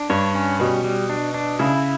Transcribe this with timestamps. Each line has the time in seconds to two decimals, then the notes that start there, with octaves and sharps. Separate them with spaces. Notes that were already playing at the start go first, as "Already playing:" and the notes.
Already playing: D4
0.10 G2 C#5
0.35 C#4
0.59 B2 G3
0.84 G3
1.09 D4
1.34 D4
1.59 C#3 E4